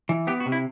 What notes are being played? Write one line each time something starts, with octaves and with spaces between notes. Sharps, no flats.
E3
B3 G4
F#4
C3
E4